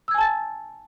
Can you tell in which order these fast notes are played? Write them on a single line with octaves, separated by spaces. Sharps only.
E6 G#6 G#5 A5 A6